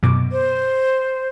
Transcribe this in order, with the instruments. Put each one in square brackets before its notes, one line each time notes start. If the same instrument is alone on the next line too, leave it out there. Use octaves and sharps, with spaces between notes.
[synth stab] F#2 B2 D6
[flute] C5